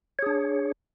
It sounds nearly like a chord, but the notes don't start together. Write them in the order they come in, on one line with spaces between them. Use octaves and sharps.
C#5 G#4 D4